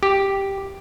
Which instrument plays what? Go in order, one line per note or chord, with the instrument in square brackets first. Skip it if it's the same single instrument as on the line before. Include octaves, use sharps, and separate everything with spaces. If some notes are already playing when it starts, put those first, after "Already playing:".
[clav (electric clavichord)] G4